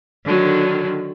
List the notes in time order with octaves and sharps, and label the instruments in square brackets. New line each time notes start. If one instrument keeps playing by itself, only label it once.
[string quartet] D3 D#3 F#3